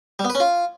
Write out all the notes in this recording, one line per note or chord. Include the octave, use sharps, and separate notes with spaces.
G3
B3
B4
C#4
F4